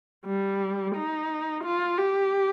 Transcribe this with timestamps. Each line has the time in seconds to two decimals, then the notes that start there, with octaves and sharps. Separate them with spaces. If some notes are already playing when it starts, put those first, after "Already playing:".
0.26 G3
0.95 D#4
1.64 F4
1.98 G4